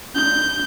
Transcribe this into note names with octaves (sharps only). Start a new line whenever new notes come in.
G6